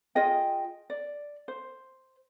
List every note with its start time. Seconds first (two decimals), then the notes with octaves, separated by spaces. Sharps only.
0.15 F4 G#4 D#5 G5
0.90 D5
1.48 C5